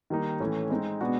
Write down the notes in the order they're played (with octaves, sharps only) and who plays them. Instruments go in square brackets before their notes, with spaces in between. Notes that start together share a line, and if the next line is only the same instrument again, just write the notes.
[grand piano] D#3 G3 A#3 D#4
A2 E3 A3 C#4
G#3 C4 D#4
B2 G#3 B3 D4 F#4